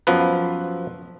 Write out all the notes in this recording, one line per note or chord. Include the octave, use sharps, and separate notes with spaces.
F#2 F3 B3 B4